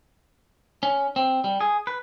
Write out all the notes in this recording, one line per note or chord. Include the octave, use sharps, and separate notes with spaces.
C#4
C4
G3
G#4
B4